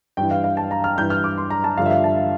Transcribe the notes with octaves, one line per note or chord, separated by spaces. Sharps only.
G2 E3 G5
F5
F5
A5
A#5
F6
G2 E3 G6
F6
D6
C6
A#5
A5
G2 D3 F3 F5
E5
F5
A5